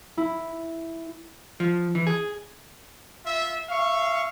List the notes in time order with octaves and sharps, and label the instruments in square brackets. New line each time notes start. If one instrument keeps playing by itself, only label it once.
[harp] E4
[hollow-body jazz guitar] F3
E3
G#4
[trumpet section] F4 E5
E5 F5 C#6